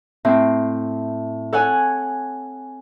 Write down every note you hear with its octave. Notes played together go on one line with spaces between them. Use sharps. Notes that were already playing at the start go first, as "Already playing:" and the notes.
A2 C4
A4 C#5 F#5 G#5